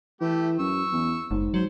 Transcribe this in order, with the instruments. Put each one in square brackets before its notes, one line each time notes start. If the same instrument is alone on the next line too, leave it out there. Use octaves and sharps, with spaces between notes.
[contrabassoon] E3 [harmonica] A3 G4
[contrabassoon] F#2 [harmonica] C#6 E6
[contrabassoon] E2
[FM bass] F#1 [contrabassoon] G#2
[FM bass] F#3 [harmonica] C5